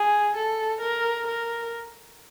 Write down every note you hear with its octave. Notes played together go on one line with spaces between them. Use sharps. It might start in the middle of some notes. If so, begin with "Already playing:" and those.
Already playing: G#4
A4
A#4
A#4